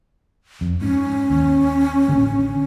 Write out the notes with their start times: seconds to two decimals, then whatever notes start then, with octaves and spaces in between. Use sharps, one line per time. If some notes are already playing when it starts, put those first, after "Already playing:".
0.61 F2
0.81 G#2 C#4
1.30 D#2
2.08 A1 D3 A#3